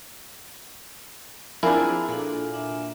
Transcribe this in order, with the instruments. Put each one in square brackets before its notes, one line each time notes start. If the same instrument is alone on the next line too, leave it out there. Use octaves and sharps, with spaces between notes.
[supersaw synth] F3 C4 D4 [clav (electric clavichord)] E4 [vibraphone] G#4 [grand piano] A#4 G#5
[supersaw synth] A#2 [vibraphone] D4 F#4 A4
[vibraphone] D4 E5